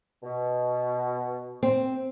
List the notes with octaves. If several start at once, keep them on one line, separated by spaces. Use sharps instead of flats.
B2
C4